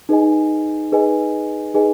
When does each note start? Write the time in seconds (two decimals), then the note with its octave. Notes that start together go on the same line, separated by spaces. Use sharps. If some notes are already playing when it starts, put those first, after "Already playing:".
0.09 D#4 G#4 B4 D#5 G#5
0.92 D#4 G#4 B4 D#5 G#5
1.74 D#4 G#4 B4 D#5 G#5